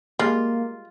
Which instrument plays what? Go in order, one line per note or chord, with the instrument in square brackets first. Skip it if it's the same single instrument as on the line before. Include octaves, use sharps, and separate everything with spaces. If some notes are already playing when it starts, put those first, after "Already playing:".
[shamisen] G3 G#3 [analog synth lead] A#3 [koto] F4